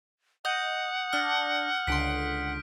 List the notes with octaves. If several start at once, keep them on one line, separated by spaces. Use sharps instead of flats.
D#5 F#5 D#6 G6
D4 F6 A#6
C#2 D3 C6 B6 D7